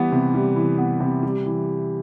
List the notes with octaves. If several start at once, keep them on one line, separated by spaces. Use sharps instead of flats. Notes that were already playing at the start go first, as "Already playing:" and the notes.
Already playing: E3 G3 B3
C3
G3
E3
B3
C3
G3
E3